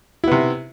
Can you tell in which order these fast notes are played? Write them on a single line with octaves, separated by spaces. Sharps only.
E4 B3 C3